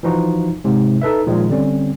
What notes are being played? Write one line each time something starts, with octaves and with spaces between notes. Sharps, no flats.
E3 F3 D#4 F#4
G#2 C3
D#4 A4 B4 E5
A#2 D#3 F3 G#3
D3 G3 C4 C#4